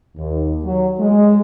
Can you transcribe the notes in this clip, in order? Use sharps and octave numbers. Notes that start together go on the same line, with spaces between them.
D#2
F#3
G#3